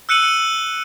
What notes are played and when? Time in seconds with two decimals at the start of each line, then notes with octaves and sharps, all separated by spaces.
0.09 E6 F#6 C#7 D#7 F#7